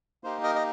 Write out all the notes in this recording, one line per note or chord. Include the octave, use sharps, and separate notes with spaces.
A#3 D#4 G4 C5
A#4 D#5
D#5